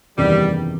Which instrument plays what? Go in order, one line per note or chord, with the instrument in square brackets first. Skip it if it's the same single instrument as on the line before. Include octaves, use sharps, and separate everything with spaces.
[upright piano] F#1 E2 C3 D#3 [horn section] G3